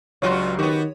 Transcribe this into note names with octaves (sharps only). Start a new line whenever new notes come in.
C#2 G2 F#3 F4 F#4 C#5 C6
D#3 B3 F#4 G4